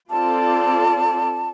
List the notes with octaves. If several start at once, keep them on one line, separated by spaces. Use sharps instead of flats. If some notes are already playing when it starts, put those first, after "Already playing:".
C4 F4 A4 D5 A5